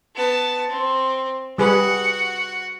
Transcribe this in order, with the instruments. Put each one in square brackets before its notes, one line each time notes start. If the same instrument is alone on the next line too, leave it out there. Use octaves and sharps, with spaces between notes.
[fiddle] B3 A5
C4
[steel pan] G3 G#4 B4 [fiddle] F#4 F#5